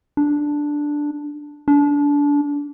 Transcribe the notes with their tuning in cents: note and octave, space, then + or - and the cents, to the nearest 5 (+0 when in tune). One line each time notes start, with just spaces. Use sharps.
D4 +0
D4 -25